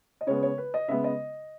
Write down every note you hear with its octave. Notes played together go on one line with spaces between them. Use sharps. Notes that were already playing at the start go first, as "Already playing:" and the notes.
D#5
C#3 G#3 B3 C#5
C#5
B4
D#5
C#3 G#3 B3 E5
D#5